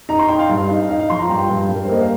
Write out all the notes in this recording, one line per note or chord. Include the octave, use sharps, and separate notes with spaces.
D#4 A#5
C6
D#4 G5
F5
G2
D#4
D#4 F5
F5
F3 C6
A#5
G2 G5
G2
G2
A#4
C5
A#3 D#5
F5